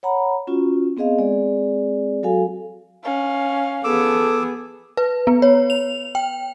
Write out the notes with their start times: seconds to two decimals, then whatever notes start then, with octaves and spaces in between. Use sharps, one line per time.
0.03 C#5 F#5 A#5 B5
0.47 C#4 F4 F#4
0.97 B3 C4 G#4 D#5 F5
1.19 G#3 C4 G#4 D5
2.23 F#3 F#4 A4 F5 G#5
3.04 C#4 F5
3.84 B3 G#4 A4 D6 E6
4.97 B4
5.27 B3
5.42 C#5
5.70 F7
6.15 G5